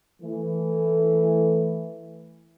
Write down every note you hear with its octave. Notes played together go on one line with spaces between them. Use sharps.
E3 A3